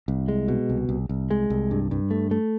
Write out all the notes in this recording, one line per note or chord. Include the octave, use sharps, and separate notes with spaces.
C2
G#3
B2
C2
C2
C2
G#3
C2
G2
G2
A3
A3